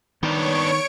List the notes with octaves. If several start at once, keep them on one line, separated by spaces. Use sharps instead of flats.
D#3 B3 D4 C#5 C#6 D7